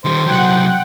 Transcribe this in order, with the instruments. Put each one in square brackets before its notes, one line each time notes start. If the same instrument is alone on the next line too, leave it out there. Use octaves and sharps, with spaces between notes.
[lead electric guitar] D#3 G3 [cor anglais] C5
[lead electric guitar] C2 F#3 [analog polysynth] F#5 G5